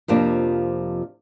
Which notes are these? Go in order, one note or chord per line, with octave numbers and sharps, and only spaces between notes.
F2 C3 F3 A#3 D4